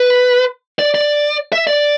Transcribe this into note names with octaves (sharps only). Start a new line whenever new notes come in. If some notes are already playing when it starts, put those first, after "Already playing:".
Already playing: B4
D5
D5
E5
D5